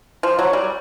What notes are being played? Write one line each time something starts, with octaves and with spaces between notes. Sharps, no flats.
F3
F#3
G3